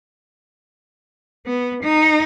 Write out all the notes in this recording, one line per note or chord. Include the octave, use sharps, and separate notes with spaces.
B3
D#4